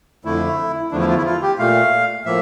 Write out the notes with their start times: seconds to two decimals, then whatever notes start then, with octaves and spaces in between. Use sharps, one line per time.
0.25 F2 D3 A3 E4
0.91 E2 D3 F3 A3 D4
1.00 E4
1.08 F4
1.17 E4
1.25 F4
1.42 G4
1.59 A#2 A3 F5
2.25 A2 F3 A#3 E5